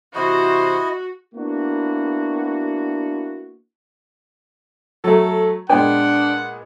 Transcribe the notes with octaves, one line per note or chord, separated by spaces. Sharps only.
C3 E3 E4 F#4 C5 D#5
A#3 B3 D4 E4 F#4
F#3 A3 A4
A#2 G#3 B3 D4 F#5 G5